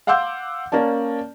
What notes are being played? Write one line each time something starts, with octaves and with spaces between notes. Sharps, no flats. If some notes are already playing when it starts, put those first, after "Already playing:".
F5 F#5 C6 D6 E6 G6
A#3 C#4 D5 A5